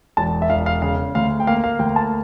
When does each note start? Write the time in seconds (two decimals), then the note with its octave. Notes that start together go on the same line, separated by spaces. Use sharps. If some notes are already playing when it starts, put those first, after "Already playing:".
0.17 E1 A5
0.42 E5
0.50 E1 F5
0.66 F5
0.82 C#3 F5
1.15 D2 F5
1.40 G5
1.47 A#3 F5
1.64 F5
1.79 D2 G5
1.96 A5